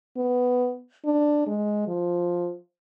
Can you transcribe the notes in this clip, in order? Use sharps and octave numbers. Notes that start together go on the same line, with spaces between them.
B3
D4
G#3
F3